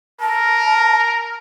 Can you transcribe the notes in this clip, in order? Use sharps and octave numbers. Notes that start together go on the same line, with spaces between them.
A#4 A5